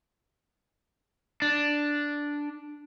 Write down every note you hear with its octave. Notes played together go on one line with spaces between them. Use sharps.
D4